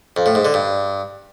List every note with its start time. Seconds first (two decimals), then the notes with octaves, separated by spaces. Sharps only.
0.17 F2
0.26 A2
0.35 G#2
0.45 D3
0.54 G2